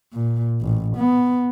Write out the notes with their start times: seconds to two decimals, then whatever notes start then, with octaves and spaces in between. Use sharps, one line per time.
0.13 A#2
0.61 A1
0.97 B3